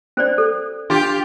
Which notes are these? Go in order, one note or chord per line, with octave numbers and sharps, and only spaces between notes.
C#4 C5 D5
A4
D4 F4 G4